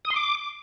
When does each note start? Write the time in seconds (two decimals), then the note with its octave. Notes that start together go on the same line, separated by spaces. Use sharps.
0.05 D#6
0.10 C6
0.16 D6